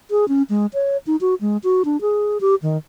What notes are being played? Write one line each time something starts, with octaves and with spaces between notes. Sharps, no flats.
G#4
C#4
G#3
C#5
D#4
F#4
G#3
F#4
D4
G#4
G4
D#3